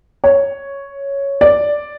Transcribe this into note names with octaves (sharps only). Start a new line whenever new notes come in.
C#5
D5